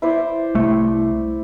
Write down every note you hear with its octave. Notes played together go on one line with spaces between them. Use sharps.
E4 C5 D5
C2 A3